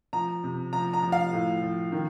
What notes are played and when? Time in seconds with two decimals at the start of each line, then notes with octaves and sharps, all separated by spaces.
0.13 F3 A#5
0.44 C3
0.73 F3 A#5
0.93 A#5
1.02 F3
1.12 F5
1.33 A2
1.62 F3
1.92 D#3